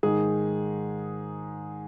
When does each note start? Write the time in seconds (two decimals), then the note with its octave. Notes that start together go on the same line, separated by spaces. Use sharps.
0.03 G#2 D#3 G#4